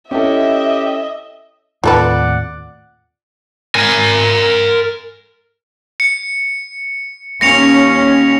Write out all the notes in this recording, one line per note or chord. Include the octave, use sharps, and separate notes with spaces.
C#4 E4 G4 A4 D#5 E5
D#2 A2 C4 F4 A4 B4 D5 F#5
A#4 G#5
C#7
D#2 C#4 A#6 C#7 F7